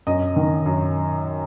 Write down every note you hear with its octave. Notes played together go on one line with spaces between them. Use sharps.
F#2 D#5
D#3
F#2